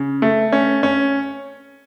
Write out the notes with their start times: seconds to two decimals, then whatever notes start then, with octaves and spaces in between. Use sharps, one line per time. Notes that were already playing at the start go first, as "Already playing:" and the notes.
Already playing: C#3
0.22 A3
0.52 C#4
0.83 C#4